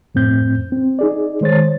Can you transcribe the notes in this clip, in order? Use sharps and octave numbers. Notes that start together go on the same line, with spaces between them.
F2 A2 C4 G6
C4
D#4 G#4 D5
D#3 G#3 C5 C#5 A6